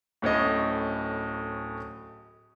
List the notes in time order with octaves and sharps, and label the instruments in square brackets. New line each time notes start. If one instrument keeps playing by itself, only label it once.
[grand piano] D1 A2 C#4 D#5